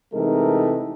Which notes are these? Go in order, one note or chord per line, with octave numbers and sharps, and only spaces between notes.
C3 E3 G#3 A3 D#4 A#4